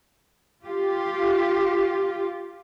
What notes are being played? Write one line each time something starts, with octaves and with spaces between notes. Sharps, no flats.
F4 G4